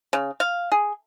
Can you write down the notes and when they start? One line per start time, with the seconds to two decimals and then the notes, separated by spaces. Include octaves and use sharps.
0.13 C#3
0.40 F5
0.72 G#4